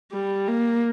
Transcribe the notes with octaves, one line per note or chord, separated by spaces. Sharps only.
G3
A#3